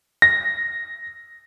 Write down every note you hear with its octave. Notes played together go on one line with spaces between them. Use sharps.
A#6